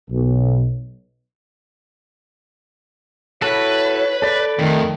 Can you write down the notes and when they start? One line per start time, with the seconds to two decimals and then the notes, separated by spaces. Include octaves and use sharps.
0.10 B1
3.42 E4 F#4 A4 B4 C#5
4.22 A4 D5 B5
4.59 F2 D#3 A3